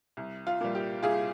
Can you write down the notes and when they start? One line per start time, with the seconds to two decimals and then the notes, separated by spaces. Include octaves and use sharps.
0.17 C2
0.47 F4
0.61 A#2 G3
0.75 G4
1.03 C2 F4 G#4